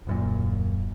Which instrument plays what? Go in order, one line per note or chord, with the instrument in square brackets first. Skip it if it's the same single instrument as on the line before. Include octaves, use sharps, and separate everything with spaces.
[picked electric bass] D#1 F#2 A#2